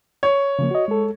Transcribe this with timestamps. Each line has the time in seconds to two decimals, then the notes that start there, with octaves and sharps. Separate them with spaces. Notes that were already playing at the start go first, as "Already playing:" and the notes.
0.23 C#5
0.59 C#3 F3 A#3
0.71 F#4 D#5
0.88 G#3 A4